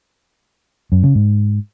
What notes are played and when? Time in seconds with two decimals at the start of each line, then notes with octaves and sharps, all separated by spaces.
0.92 F#2
1.03 C#3
1.15 G#2